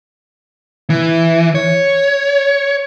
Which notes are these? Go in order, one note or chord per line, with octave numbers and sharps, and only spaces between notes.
E3
C#5